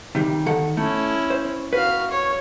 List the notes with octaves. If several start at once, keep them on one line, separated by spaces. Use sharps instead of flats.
C3 D#3 G3
D#3 A4 F#5
A3 C#4 E4
C5
F#4 B4 F5
C#5